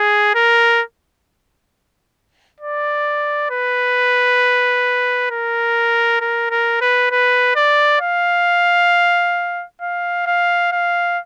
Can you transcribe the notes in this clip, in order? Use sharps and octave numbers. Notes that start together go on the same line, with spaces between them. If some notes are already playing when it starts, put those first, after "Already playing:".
Already playing: G#4
A#4
D5
B4
A#4
A#4
A#4
B4
B4
D5
F5
F5
F5
F5